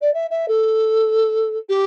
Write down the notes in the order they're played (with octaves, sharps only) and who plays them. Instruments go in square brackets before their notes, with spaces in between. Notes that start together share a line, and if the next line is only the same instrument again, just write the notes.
[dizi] D5
E5
E5
A4
G4